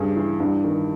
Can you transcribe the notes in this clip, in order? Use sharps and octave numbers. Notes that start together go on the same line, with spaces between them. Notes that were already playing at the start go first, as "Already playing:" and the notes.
Already playing: G2 C#3 G#4
E3
G2
D#3